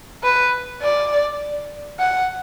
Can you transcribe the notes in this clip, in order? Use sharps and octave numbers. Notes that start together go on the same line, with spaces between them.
B4
D5
F#5